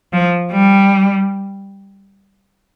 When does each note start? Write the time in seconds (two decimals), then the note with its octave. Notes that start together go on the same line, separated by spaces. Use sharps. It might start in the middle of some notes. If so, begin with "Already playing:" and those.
0.13 F3
0.52 G3